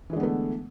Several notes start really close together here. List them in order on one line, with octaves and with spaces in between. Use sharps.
E3 G#3 D3 B3 A3